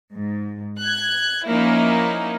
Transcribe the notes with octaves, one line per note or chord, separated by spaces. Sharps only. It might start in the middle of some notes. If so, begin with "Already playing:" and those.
G#2
F#6 G#6
F3 A#3 C#4 D#4 E4